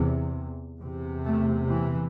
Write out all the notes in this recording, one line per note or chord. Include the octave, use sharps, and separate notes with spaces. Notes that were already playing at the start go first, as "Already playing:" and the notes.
Already playing: E2 C3
E2 C3
A3
E3